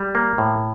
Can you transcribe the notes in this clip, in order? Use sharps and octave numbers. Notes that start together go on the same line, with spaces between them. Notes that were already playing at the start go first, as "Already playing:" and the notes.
Already playing: G3
A#3
A2